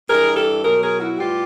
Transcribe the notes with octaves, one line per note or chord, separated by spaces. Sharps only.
G2 E3 G3 G#4 A#4
G4 A4
B2 F#3 G#4 A#4
G#4 A#4
E4 F#4
A2 E3 G3 F4 G4